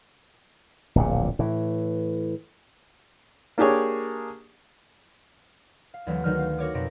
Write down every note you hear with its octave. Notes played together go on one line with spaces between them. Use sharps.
D1 A#1 A#2
A2 E3
A#3 D4 G4 G#4 C#5
F5
D2 E3 F#3
D2 D#3 F#3 D#4 G#4 F6
F5
F#4 A#4 C#5 D6
F2 B2 C4 A#5 A#6 D7